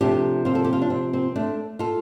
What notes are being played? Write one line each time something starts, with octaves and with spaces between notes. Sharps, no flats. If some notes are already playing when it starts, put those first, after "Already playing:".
C3 F3 A3 D4 G4
C4 F4
A4
G4
F4
D4
C4
C4
A3 D4
F4 A4